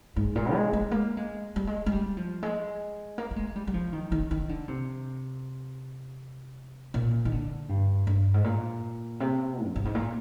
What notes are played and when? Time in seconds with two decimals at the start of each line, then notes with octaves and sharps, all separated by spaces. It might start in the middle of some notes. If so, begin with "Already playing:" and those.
0.16 G#2
0.35 A#2
0.54 G#3
0.73 G#3
0.91 A#3
1.17 G#3
1.56 G3
1.67 G#3
1.86 G#3
1.92 G3
2.17 F3
2.43 G#3
3.18 A#3
3.31 A#3
3.36 G#3
3.56 G3
3.67 G3
3.74 F3
3.93 D#3
4.12 D#3
4.31 D#3
4.49 D3
4.68 C3
6.94 A#2
7.25 D#3
7.32 D3
7.69 G2
8.07 G2
8.34 G#2
8.44 A#2
9.20 C3
9.66 F2
9.76 G2
9.85 G#2
9.95 A#2